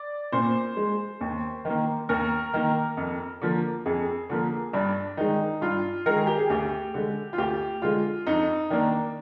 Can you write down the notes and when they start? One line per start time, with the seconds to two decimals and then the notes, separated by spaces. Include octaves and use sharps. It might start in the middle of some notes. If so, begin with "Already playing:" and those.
Already playing: D5
0.32 A#2 C5
0.77 G#3
1.21 D#2
1.65 D#3 A#3
2.09 D#2 A#4
2.54 D#3 A#3
2.97 F2
3.41 D3 F3 A#3
3.86 F2 G#4
4.29 D3 F3 A#3
4.73 G2 D4
5.17 D#3 G#3 D#4
5.61 G2 F4
6.06 D#3 G#3 A#4
6.16 G#4
6.27 G4
6.38 G#4
6.50 D2 G4
6.94 D3 G#3
7.33 F4
7.38 D2 G4
7.82 D3 G#3 F4
8.27 F2 D#4
8.70 D#3 A#3 D4